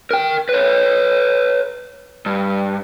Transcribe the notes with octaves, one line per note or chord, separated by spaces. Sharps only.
A#4 G5
B4 C#5
G2